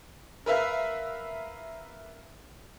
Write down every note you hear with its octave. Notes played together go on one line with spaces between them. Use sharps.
A#4 B4 E5 F5